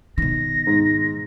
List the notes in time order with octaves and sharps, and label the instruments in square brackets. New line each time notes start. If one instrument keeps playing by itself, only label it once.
[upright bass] B2 D#3 [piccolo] A#6
[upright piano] G#2